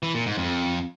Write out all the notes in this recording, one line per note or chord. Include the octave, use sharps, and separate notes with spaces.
E3
A#2
G#2
F2